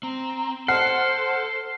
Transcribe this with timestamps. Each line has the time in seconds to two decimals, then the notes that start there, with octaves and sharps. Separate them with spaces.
0.03 C4 A#5
0.68 A4 C5 F#5 F6 C7